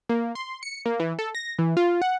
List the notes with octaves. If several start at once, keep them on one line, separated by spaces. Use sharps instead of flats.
A#3
C6
C#7
A#3
E3
A4
A#6
E3
F4
F#5